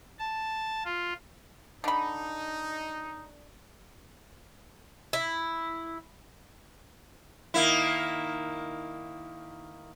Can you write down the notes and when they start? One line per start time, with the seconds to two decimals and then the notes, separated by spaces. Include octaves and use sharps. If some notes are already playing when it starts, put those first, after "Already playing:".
0.19 A5
0.85 F4
1.84 D3 D#4 B5
5.13 E4
7.54 D#3 A#3 E4